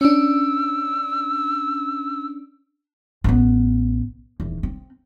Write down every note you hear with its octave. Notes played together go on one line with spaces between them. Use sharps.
C#4 D4 E6
A1 B3
D#1 E2
C4